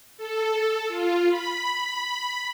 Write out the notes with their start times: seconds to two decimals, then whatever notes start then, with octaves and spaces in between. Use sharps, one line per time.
0.17 A4
0.88 F4
1.29 B5